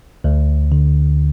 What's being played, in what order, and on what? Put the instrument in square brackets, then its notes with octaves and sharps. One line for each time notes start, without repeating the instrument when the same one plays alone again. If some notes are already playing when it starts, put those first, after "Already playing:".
[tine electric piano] D2
D3